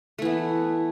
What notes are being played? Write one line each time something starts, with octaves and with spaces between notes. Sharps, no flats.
E3 A3 B3